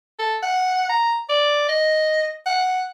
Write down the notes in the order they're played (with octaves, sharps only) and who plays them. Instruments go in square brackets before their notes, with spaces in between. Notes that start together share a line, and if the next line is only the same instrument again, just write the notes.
[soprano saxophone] A4
F#5
A#5
D5
D#5
F#5